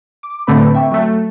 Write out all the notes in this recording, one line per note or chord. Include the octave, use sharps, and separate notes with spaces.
D6
A2 D3 A3 C4 B4 B5
E5 G5 C#6
F#3 A3